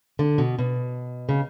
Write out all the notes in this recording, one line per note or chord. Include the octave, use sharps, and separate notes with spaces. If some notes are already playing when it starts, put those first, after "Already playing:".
D3
B2
B2
C#3